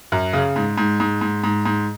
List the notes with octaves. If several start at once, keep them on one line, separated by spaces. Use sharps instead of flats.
F#2
C#3
G#2
G#2
G#2
G#2
G#2
G#2